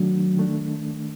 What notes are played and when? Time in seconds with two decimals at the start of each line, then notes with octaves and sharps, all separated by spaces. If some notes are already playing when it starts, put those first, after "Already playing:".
Already playing: D#3 F#3 A3 D4
0.37 D#3 A3 D4